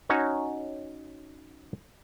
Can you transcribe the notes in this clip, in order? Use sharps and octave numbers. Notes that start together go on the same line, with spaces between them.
C#4 D#4 F#4 C#5